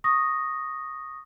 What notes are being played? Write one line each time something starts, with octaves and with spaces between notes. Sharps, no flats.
C#6 D#6 A#6